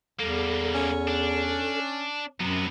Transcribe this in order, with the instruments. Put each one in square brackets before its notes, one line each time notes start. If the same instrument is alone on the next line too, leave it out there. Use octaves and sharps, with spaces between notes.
[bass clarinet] E2 [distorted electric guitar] G3 A#3 [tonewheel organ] A4
[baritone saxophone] C#4
[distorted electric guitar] D4
[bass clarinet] F#2 [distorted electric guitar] C3 B3 [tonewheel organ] F#3 A#5